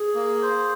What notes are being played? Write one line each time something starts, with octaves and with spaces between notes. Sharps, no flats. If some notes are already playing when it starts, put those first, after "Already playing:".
Already playing: G#4
A#3
C5